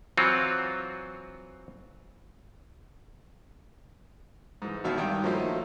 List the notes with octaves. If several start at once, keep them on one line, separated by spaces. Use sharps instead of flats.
E3 F#3 C4 F4 F#4
G#2 E3
G#1 B2 D#3 E5 F5
G2 D#3 G5
F3 F#3 A3 A#3 D#4 E4